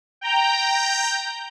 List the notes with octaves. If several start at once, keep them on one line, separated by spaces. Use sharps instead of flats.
G5 A#5 G6